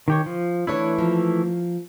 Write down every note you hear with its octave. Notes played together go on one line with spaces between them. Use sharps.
D#3 G4 C#5
F3
E3 A3 D4 E4 B4 C#5
F3 A#3